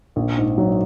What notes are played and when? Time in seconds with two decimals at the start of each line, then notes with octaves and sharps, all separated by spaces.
0.16 A#1
0.38 G#2
0.58 F#3